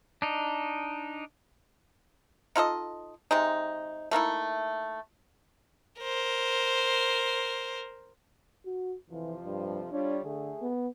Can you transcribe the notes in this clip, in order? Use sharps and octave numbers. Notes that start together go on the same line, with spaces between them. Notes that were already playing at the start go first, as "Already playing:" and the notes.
D4 D#4
D#4 F4 A4 D#5
C3 G#3 D#4
A3 A#3 D#4 E4
A#4 C5
F#4
F2 C3 E3 F3
G2
G3 D4 F4 C#5
D3 A3 G#4
B3